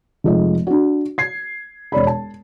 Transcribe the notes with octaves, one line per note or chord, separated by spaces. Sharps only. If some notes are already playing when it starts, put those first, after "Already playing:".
F1 G#3 F4 D#5
D4 F#4
G#6 C7
E1 C#5 D5 B5
A5